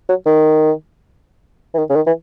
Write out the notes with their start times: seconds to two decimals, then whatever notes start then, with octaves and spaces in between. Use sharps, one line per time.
0.09 F#3
0.26 D#3
1.74 E3
1.78 D#3
1.90 C#3
1.96 D#3
2.06 E3